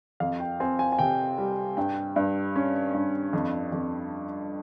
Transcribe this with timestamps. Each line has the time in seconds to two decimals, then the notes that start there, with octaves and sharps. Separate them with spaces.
0.20 F2 F5
0.40 G5
0.60 C4 G#5
0.79 G#5
0.92 G#5
0.99 C3 G5
1.38 G3
1.77 G2 G5
2.16 G2
2.56 C#4
2.94 G2
3.33 F2
3.72 F2